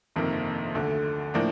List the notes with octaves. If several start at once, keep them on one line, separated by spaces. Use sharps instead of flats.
G1 F2 C3 D#3 A#3
D2 D3 A3
A2 F3 A#3 D4